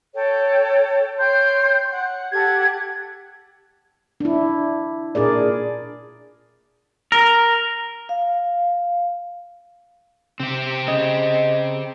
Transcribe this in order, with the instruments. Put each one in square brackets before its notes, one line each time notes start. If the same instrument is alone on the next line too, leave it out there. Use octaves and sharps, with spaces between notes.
[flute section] A4 C#5 G5
C#5 G5 C6 G6
F#5
G4 A4 F#5 G#6
[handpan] D4 E4
A#2 D4 G#4 A#4 D5
[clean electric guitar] A#4
[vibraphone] F5
[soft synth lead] C3 [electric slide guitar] C4 G4
[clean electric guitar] C#3 [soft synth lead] D#5